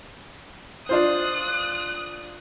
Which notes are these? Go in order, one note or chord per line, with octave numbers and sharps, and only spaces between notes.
D4 F4 C5 D#6 F#6